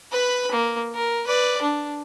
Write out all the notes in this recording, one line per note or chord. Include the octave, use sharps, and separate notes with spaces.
B4 B5
A#3
A#4
B4 D5
D4